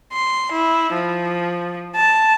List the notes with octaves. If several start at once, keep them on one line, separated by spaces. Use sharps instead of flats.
C6
E4
F3
A5